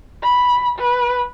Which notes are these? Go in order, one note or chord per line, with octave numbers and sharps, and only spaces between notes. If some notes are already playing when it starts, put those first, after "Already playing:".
B5
B4